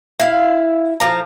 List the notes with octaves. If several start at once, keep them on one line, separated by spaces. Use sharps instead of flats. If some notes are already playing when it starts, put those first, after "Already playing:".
E4 F5
A2 F3 A#5